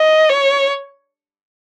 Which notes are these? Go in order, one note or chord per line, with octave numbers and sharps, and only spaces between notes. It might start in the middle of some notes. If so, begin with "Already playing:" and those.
Already playing: D#5
C#5